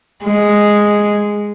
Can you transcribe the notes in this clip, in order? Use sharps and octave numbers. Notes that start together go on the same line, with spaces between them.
G#3